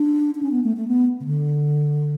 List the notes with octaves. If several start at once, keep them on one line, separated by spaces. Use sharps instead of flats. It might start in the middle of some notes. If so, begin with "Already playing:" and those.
Already playing: D4
D4
C#4
B3
A3
A3
B3
C#3
D3